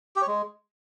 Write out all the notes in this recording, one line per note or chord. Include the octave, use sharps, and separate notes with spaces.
G4
C#5
G#3